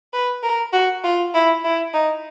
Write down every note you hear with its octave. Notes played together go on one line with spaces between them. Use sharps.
B4
A#4
F#4
F4
E4
E4
D#4